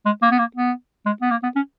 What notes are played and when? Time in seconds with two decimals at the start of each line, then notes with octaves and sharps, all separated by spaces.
0.05 G#3
0.22 A#3
0.31 B3
0.39 A#3
0.56 B3
1.06 G#3
1.21 B3
1.31 A#3
1.43 B3
1.55 C#4